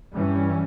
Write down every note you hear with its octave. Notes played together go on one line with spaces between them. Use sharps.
G2 E3 G3 C#4